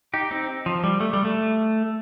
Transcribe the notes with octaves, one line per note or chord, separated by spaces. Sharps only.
D#4 G4
C4 D#4
F3
G3
A3
G3
A3